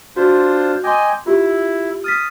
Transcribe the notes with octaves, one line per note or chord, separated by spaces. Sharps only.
D4 F4 F#4 C5
D#5 G5 G#5 C6 D6
E4 F4 G4
D#6 F6 A6 B6